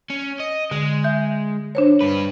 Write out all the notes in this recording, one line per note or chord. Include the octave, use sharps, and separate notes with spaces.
C#4
D#5
D3 G#3
E5 G6
D4 C5 C#5
G2 B4